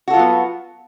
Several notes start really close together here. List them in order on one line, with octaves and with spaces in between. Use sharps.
F#4 A4 F4 F#3 B3